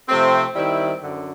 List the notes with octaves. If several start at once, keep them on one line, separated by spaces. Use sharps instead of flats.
C3 F3 A3 C4
D#3 G3 C4 E4
F#2 D3